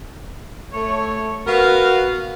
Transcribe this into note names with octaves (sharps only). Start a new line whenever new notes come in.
A3 C#5
B3 F#4 A#4 F5